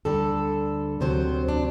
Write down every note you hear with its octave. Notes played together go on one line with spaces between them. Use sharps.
D2 D3 G3 A4
D2 C3 F#3 C5
D4